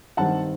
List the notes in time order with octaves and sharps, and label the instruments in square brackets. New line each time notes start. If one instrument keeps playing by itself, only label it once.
[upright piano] G2 D#3 G3 C4 F#5 A5